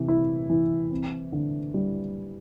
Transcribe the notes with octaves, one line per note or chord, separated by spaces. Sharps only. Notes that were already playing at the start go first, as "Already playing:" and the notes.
Already playing: C3 E3
E4
E3
C4
D3
G3